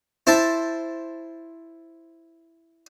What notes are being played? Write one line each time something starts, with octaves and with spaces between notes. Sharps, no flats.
E4 C5 E5 A5